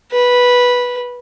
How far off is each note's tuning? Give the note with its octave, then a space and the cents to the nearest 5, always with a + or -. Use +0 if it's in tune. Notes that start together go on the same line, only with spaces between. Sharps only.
B4 -10